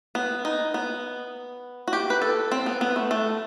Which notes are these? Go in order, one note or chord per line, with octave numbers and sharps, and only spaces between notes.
B3
D#4
B3
F#4
G4
B4
A4
C4
B3
B3
A3
A3